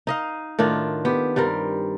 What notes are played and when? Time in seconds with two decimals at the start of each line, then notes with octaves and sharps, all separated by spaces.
0.07 D#4 D#5 F5
0.59 A2 D#3 D4 F4
1.05 B3 G4
1.36 G2 G3 C4 A#4